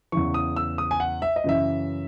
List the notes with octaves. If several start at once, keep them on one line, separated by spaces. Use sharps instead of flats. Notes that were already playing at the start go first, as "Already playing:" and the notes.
E2 C#3 E3 C#6
D#6
E6
D#6
G#5
F#5
E5
D#5
F#2 C#3 E3 E5